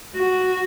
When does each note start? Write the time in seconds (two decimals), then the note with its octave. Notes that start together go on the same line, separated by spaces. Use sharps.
0.16 F#4